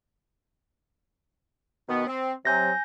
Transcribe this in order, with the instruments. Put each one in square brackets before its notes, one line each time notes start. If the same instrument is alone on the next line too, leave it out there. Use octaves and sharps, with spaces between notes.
[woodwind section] B2 D#3 B3
C4
[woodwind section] C3 F#3 [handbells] G#5 G6 A#6